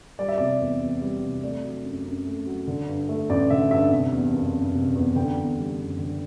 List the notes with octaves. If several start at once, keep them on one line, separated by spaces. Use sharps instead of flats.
G3 D5
E5
C3 D5
E2
E2
G3
C3
A3 D5
F#3
F#2
F#2
A3
F#3
D3
G2
A3
A1 D5
D3 E5
G2 E5
C3
E2
F#1
F#1
C3
E2
D3 G5
E2
G3
F#1
D3